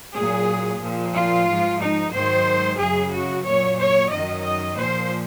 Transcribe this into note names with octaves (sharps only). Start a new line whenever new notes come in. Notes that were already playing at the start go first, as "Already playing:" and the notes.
A#2 F#3 G#4
A#2 F3
F4
G#2 F3
D#4
G#2 D#3 F#3 C5
F#2 C#3 F#3 G#4
F#4
A#2 F#3 C#5
C#5
F#2 D#3 F#3 D#5
D#5
A#2 F3 C5